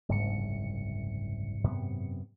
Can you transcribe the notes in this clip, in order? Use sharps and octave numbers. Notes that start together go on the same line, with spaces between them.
F#1 C2 G#2 C#7
F#2 C3 B3